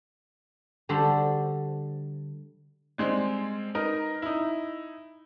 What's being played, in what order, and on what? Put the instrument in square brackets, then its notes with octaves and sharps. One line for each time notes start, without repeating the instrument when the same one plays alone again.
[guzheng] D3 G3 F#4 A4 C5
[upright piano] G3 G#3 C4
D#4 A#4 B4
D#4 E4